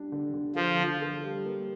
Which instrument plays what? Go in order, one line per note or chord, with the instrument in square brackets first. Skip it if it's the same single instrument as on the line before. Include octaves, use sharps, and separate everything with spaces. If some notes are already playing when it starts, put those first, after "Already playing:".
Already playing: [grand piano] G3 D4
D3
D3
[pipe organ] F3 [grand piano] A4
[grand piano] D3
A4
G3
A#3